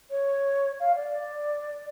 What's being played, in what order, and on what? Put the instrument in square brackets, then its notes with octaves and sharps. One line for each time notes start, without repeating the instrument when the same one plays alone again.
[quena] C#5
F5
D5